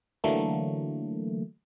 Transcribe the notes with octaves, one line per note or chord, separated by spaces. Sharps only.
D3 E3 F#3 A3 A#3